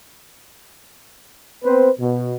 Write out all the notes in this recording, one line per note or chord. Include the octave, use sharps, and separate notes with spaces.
B3 C4 B4 C5
B2